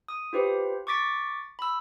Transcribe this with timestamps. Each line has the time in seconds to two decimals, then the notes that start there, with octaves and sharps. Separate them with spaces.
0.08 D#6
0.33 F4 G4 B4 C5
0.87 C#6 D6 A6 B6 D7
1.59 B5 E6